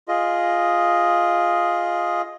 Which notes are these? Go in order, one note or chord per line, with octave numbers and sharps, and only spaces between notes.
F4 G#4 D#5